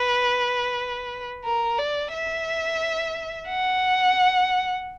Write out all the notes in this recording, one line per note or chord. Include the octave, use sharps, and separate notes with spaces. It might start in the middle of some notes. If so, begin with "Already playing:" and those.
Already playing: B4
A#4
D5
E5
F#5